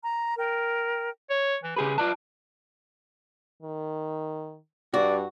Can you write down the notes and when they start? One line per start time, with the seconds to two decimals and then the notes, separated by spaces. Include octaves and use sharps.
0.03 A#5
0.37 A#4 G5
1.30 C#5
1.63 E3
1.77 C#3 G4 G#4 B4
1.98 F4 B4 D5 A5
3.63 D#3
4.94 G2 F#4 D5